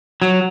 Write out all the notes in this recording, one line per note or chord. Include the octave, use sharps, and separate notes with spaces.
F#3